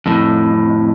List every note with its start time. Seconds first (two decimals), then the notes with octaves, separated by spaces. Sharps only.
0.06 F2 A2